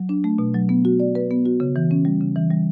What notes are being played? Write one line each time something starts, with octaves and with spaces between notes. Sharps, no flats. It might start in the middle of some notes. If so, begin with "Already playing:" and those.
Already playing: F#3
D4
A3
B2
F#3
B3
F#4
D5
B4
B3
F#4
C#3
E3
C#4
G3
C#3
E3
G3